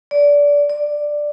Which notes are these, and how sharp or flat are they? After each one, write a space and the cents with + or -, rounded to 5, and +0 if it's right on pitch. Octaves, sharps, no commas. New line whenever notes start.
D5 -20
D5 +5